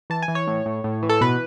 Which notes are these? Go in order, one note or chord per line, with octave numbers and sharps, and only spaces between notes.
E3 A5
G#5
E3
C#5
A2
A2
A2
E3
A4
B2 B4